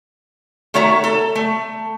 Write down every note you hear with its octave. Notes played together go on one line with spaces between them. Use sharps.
D#3 A3 F#4 C#5 E5 A#5
A4
A3